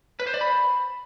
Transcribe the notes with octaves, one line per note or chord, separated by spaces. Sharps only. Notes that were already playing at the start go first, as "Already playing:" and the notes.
B4
C5
D5
B5